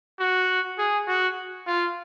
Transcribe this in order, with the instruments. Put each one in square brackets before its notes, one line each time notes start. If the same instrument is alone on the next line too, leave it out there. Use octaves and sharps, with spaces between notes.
[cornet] F#4
G#4
F#4
F4